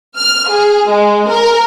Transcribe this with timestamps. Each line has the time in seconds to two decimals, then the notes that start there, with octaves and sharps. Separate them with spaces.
0.18 F6
0.49 G#4
0.90 G#3
1.29 A#4